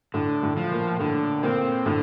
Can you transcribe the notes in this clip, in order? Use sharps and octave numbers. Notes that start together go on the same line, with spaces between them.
A2 D3
A2
F3
A#2
A2 D3
A#2 C4
A2 D3